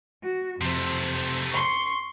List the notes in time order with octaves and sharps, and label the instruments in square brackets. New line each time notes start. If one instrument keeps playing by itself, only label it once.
[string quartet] F#4
[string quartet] F2 C5 [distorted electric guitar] C3 A3
[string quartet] C6 C#6